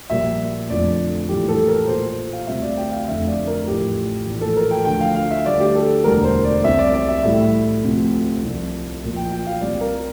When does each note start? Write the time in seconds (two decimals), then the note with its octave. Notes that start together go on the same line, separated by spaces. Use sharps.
0.10 A#1 A#2 G3 E5
0.69 F1 F2 D3 F3 D5
1.29 A#1 A2 E3 G3 G4
1.49 A4
1.68 A#4
1.88 A#1 A#2 F3 C5
2.33 F5
2.47 D2 C3 G3 E5
2.62 D5
2.77 G5
2.92 F5
3.08 F1 F2 D3 F3 E5
3.27 D5
3.47 A#4
3.67 A1 A2 F3 G4
4.26 A#1 A2 E3
4.41 A4
4.56 A#4
4.71 G5
4.85 D2 D3 F3 G5
5.01 F5
5.15 F5
5.31 E5
5.45 D2 D3 G3 D5
5.60 G4
5.75 A4
6.04 E1 D2 D3 G3 A#4
6.24 C5
6.45 D5
6.64 C2 C3 G3 E5
6.79 D5
6.94 D5
7.09 E5
7.23 A1 A2 G3 E5
7.83 D2 C3 F3
8.43 C2 C3 F3
9.02 A#1 A#2 F3
9.16 G5
9.32 G5
9.47 F5
9.61 C2 C3 G3 D5
9.81 A#4